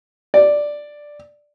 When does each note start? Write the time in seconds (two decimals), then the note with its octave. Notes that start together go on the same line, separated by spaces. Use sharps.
0.34 D5